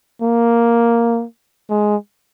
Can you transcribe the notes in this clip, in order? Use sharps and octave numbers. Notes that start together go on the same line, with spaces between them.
A#3
G#3